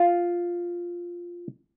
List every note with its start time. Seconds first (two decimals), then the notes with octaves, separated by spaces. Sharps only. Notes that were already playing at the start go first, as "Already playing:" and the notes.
Already playing: F4